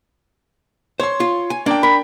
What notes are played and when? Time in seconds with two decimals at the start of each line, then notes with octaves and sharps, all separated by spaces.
1.00 C5 C#5 C6
1.20 F4
1.50 G#5
1.66 A#3 D4 G5
1.83 A#4 B5